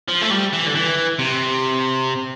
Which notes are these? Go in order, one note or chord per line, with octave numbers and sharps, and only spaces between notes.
F3
A3
G3
E3
D3
E3
C3